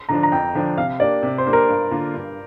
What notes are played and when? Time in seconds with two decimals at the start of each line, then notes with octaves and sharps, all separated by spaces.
0.09 D3 F3 D4 A#5
0.23 A#5
0.32 F2 G5
0.55 D3 F3 D4
0.78 C3 F5
1.00 A#3 D4 G4 D5
1.23 C3
1.38 C5
1.46 A#3 D4 G4
1.53 A#4
1.69 G2
1.91 D3 A#3 F4
2.14 G2